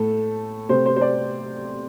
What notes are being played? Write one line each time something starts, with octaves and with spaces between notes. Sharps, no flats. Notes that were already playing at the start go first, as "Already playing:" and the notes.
Already playing: A2 A3 A4
C3 A3 C5
C5
C5
D5